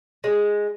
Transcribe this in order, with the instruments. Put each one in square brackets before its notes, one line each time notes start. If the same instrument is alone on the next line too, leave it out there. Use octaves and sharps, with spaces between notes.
[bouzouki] G#3